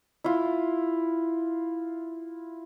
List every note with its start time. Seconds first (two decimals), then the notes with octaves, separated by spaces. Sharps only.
0.24 E4 F4